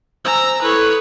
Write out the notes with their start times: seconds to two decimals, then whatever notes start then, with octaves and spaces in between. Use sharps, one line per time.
0.25 C5 G#5 A#5 E6
0.62 E4 A4 B4 C#5 D#6